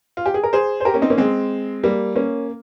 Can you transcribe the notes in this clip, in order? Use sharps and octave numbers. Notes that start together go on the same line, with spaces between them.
F4
G4
G#4
A#4
G#4 C5
C5
G4 A#4
A#3 C#4
C4 D#4
A#3 C#4
G#3 C4
G3 A#3
A#3 C#4